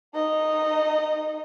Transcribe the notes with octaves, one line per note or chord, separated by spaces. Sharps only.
D#4 D#5